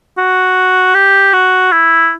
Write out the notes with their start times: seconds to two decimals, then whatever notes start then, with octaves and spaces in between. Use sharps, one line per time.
0.18 F#4
0.95 G4
1.33 F#4
1.72 E4